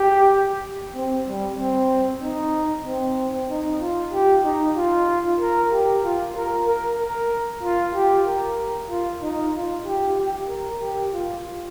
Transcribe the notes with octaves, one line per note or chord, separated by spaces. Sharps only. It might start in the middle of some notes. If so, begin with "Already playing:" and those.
Already playing: G4
C4
G3
C4
D#4
C4
D#4
F4
G4
D#4
F4
A#4
G4
F4
A#4
A#4
A#4
F4
G4
A#4
F4
D#4
F4
G4
G4
A#4
G4
F4